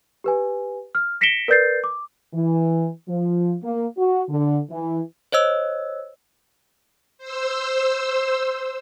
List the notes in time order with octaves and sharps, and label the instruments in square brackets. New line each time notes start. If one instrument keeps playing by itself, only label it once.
[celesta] G4 B4 G#5
F6
A#6 B6 C#7 D7 E7 G7
A#4 B4 D5 G6 A6 C7
D6
[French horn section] E3
F3
A#3
F#4
D3
E3
[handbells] C5 C#5 D#5 E6
[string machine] C5 E6